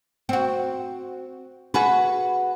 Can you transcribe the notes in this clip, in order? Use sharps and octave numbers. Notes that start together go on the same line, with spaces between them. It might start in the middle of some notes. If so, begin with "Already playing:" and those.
C4 F#4
F#4 G#4 B4